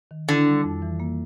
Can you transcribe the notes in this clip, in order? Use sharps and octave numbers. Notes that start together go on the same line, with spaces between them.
D#3
D3 E4
G3
F2
E3
A#3